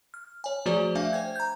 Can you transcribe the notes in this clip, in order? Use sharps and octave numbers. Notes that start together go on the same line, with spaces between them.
F6
C#5 G#5
F3 A3 F#4 G#4 C5 D5
A3 D4 E5 F5 G#5
C5 G5 G#6
A#5 G6